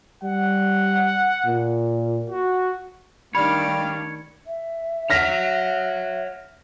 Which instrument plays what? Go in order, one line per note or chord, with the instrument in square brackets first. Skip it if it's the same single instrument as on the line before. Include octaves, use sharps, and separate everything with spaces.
[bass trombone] G3 [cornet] F#5
[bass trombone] A#2
[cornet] F#4
[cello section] D#3 A3 D4 [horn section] G3 D5 F5 [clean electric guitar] C#5 [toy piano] B5
[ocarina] E5
[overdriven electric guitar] C#5 F#5 [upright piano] F6 A#6 B6